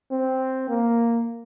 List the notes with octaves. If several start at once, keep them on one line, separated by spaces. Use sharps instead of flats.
C4
A#3